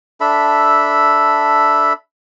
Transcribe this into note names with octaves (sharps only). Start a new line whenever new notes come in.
D4 A4 E5 B5